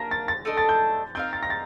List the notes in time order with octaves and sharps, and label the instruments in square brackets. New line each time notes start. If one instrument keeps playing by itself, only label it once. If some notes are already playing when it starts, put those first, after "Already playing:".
Already playing: [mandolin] A#3 D4 G4 A#4 [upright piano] A#6
[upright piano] A6
A6
[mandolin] A3 D4 A4 D#5
[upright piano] A6
G6
[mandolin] C4 D#4 A#4 F5 [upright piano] G6
[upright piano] A6
A#6
A6